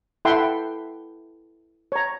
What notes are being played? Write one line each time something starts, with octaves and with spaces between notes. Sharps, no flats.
E4 A4 E5 F#5 G5 C6
C#5 A#5